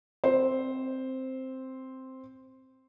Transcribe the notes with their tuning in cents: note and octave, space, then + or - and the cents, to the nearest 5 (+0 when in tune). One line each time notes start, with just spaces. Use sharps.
C4 +0 C5 +0